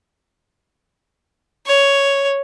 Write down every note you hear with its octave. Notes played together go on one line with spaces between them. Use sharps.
C#5